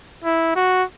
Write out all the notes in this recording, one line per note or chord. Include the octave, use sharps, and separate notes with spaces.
E4
F#4